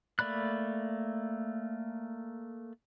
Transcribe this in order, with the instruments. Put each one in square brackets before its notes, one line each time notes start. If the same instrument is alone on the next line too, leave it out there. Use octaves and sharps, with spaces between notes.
[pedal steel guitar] A3 A#3 D5 B5 F#6